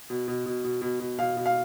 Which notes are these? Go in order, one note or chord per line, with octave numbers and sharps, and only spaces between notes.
B2
B2
B2
B2
B2
B2
B2 F5
B2
F5